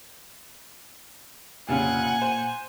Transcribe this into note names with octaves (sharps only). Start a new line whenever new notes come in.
F1 A#2 C#3 F5 F#5 G#5
C5